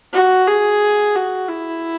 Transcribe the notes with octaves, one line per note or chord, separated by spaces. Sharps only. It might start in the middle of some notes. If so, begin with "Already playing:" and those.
F#4
G#4
F#4
E4